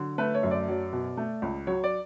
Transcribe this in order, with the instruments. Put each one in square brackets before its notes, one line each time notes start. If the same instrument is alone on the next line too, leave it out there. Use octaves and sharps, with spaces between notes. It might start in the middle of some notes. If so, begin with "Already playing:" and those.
Already playing: [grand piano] D3 F#3
A3 B4
C#5
F#2
D5
F#3
B2
A3
C#2
F#3 C#5
D5